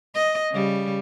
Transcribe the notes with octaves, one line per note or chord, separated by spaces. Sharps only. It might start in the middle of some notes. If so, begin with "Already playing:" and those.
D#5
C#3 G3